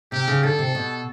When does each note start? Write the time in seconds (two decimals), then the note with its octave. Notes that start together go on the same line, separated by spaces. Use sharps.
0.12 C3 G4
0.28 C#3
0.43 D3 A4
0.59 C3
0.75 B2